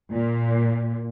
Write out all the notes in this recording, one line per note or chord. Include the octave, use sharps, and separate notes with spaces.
A#2